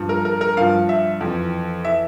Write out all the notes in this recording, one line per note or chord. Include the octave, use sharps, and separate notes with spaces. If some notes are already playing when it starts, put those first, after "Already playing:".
Already playing: G2 F3
A#4
A#4
A#4
G2 F3 F5
E5
F2 E3
E3 E5